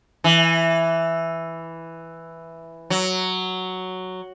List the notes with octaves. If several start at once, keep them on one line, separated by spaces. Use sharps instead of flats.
E3
F#3